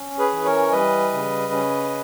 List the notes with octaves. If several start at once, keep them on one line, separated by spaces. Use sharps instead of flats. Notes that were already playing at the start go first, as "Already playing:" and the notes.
Already playing: C#4
G#4 B4
E3
A#4 C#5
G3 B4 D#5
C#3
C#4